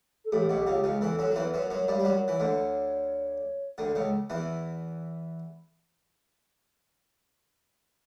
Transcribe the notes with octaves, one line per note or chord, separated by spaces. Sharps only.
A4
A1 A2 G4
B1 B2
C#2 C#3
C#2 C#3
E2 E3 A4
F#2 F#3
F#3
E2 E3 B4
F#2 F#3
F#2 F#3 C#5
G2 G3
G3
F#2 F#3
E3
D2 D3
D2 D3
C#2 C#3
E2 E3